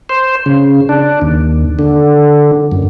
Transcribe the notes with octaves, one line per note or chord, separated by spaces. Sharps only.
C5
C#3
D4
D#2
D3
F#2